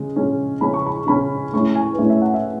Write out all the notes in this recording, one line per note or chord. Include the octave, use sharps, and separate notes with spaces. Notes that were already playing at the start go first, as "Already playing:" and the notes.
Already playing: C#3 G#3
C#3 G#3 C#4
C#3 G#3 C#4 B5
C#6
B5
C#3 G#3 C#4 B5
A2 G#3 C#4 E4 C#6
G#5
B4
A2 G#3 C#4 E4 C#5
E5
F#5
E5